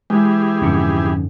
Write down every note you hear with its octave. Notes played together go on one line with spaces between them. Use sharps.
E3 G#3 G4 G#4
F2 G#2 D3 C#4